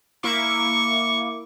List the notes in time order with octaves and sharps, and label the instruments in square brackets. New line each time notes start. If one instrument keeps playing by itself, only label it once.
[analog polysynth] A#3 E4 D6 [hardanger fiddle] C#6